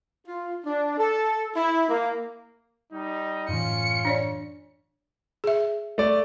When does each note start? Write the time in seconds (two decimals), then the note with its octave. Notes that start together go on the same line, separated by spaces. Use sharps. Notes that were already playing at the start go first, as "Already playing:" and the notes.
0.27 F4
0.65 D4
0.98 A4
1.55 E4
1.89 A#3
2.93 G3 D#4
3.49 F#2 A2 E3 C#4 F4 C#7
4.05 D4 C#5 D5
5.44 G#4 E5
5.98 A3 D5